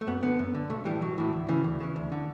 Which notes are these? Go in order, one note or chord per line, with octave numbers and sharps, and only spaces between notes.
A3
F#2 B3
D3 B3
F#2
D3
B1 A3
A2 E3 G3
B1 F#3
A2 E3
D2
C#3 E3
D2
C#3 E3
D2
D3